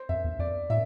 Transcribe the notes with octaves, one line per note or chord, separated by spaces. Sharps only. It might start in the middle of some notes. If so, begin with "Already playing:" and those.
Already playing: C5
F2 E5
E2
F2 D5
A2 E5